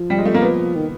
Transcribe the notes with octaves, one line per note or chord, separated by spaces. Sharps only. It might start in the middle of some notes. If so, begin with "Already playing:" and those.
Already playing: F3
G3
G#3
A3
A#3
B3
D#3